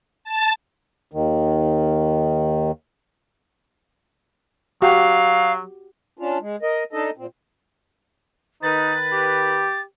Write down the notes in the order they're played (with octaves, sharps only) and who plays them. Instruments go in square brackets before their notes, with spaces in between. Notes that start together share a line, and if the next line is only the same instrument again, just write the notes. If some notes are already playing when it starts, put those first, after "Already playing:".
[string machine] A5
[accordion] D#2 D#3
[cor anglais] F#3 [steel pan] F#4 G4 [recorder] F5
[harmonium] C#4 D4 F4
G#3
A#4 D#5
D4 D#4 A4 D#5
A#2 C4
[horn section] D#3 B4 [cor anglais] D#4 [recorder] A6
[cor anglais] G4